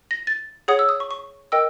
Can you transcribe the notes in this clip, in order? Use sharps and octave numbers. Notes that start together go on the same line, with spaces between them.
A#6
A6
G#4 C#5 F#5 D#6
E6
D#6
C#6
C#6
A#4 D#5 G5 E6